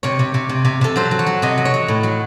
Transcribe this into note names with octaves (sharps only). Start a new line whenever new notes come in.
C3 C#5
C3
C3
C3
C3
C3 A4
F#3 C5
F#3
C#5
F#3
C3 D#5
F#3
C#5
F#3
A2
F#3